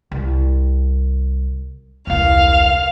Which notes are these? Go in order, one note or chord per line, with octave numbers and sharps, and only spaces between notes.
C2
E1 C2 F5